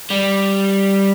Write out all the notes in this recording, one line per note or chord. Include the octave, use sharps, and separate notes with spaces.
G3